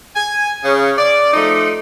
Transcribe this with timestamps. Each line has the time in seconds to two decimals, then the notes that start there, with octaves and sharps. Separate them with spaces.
0.15 G#5
0.64 C#3
0.97 D5
1.33 F3 A3 D#4